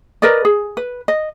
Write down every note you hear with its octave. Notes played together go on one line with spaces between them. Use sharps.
A#4 B4 D5 D#5
G#4
B4
D#5